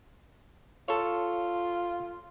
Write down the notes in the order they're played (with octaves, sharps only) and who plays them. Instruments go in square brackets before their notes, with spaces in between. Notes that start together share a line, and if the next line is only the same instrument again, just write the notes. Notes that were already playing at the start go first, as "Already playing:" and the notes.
[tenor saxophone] F4 [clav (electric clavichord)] A4 C#5